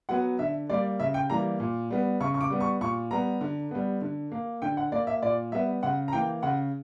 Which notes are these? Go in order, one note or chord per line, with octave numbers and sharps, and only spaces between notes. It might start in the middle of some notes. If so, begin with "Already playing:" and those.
F#3 B3 F#5
D3 E5
G3 A#3 D5
C#3 E5
G5
E3 G3 A#3 A#5
A#2
G3 B3
C#3 C#6
C#6
D6
G3 B3
C#6
A#2 C#6
G3 B3 A#5
D3
G3 B3
D3
A#3
D3 G5
F#5
A#3 D5
E5
A#2 D5
G3 B3 E5
C#3 F#5
A#5
E3 A#3 G5
C#3 F#5